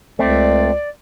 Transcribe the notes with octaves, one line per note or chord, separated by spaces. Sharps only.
C#2 A3 C4 D5